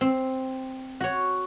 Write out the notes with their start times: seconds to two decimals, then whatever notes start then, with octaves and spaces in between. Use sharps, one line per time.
0.01 C4
1.00 F#4 C#5